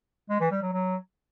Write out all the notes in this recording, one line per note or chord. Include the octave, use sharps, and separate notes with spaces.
G#3
E3
G3
F#3
F#3